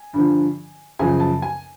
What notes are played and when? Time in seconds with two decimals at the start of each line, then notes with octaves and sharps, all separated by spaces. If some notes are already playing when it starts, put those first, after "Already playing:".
Already playing: G#5
0.13 G2 D3 F3
0.99 F#2 C#3 F3 G#5
1.20 A5
1.42 G#5